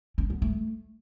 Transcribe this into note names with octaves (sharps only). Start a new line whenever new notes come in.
C#4
B3
A3